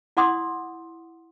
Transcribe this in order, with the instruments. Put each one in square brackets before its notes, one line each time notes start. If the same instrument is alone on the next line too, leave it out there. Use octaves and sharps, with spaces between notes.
[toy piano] E4 D5 F#5 C6 D6 D#6